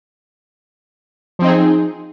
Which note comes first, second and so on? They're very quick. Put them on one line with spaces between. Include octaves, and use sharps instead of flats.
F3 C4 D#4 G#4